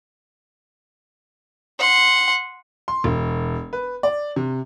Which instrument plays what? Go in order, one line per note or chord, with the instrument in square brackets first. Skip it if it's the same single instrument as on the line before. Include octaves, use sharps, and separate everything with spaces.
[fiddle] F#5 C6
[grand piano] C6
E1
B4
D5
C3